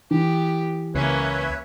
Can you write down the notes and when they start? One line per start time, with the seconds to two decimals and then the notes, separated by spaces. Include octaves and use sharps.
0.11 E3 B3 G4
0.95 C#2 A#3 C#4 B4 C#5 E5